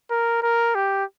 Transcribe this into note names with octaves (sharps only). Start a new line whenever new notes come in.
A#4
A#4
G4